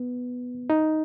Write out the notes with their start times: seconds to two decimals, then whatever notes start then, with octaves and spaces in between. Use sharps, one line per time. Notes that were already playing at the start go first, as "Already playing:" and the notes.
Already playing: B3
0.70 D#4